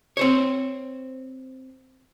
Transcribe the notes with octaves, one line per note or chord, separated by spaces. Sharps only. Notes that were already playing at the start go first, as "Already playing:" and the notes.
C4 C5 C#5